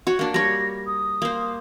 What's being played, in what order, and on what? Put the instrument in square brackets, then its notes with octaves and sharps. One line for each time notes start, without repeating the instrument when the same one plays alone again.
[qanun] F#4 C#5
A#3 D4
[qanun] G3 C#5 [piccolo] A#6
[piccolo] D#6
[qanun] A#3 C5